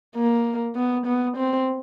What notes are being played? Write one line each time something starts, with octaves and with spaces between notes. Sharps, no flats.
A#3
B3
B3
C4